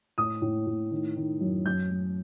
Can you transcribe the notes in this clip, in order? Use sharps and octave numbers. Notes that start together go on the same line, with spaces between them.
A2 D#6
A2
A2
D#3
D#3
F#2
F#2 G6
F#2